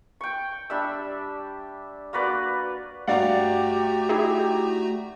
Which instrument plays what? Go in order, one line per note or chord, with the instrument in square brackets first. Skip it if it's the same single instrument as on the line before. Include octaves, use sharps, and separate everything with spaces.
[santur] G5 C#6
G3 D4 E5 E6
A#3 F#4 B4 D5
[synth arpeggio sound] G2 [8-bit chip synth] A3 F#4 A#5 [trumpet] G4 [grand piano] D5 F5 F#5
[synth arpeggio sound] D#4 E4 G#4